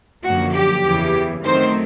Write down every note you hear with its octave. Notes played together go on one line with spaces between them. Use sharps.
F#2 D3 F3 A#3 F#4
G4
E2 C#3 E3
F#2 D#3 F#3 A3 C4 C5